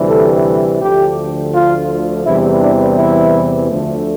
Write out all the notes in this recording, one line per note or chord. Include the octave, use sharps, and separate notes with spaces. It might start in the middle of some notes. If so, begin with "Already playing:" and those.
Already playing: D2 C3 E3 G3
A4
D2 D3 F3 A3 G4
F4
E2 C3 E3 G3 E4
D4
E4
D2 D3 F3 A3